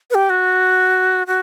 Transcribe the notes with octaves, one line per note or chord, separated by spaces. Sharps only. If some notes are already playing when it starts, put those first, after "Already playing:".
B4
G4
F#4
F#4